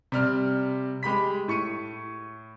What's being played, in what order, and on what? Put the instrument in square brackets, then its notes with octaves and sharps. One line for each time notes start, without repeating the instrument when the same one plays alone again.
[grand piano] C3 G3 F6
G#3 G4 B5 B6
A2 C#6 C#7 D#7